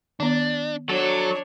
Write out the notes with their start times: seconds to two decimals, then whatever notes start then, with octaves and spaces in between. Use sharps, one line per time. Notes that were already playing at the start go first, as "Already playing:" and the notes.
0.20 D#3 B3 D4
0.89 F#3 D4 A4 C#5